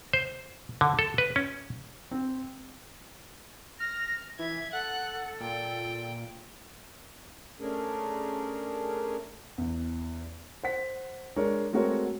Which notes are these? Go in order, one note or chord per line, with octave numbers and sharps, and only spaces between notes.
C5
D3
A4
B4
C#4
C4
F6 A#6
E3 E5 G#6
A4 F#5 F#6
A#2 G5
A3 C#4 D4 G#4 A#4
E2
C5 F#5 B6
G#3 D4 A#4 C#5
G#3 A3 C4 F#4 A#4 C#5